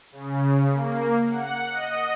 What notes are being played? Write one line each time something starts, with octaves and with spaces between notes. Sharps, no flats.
C#3
A#3
F#5
D#5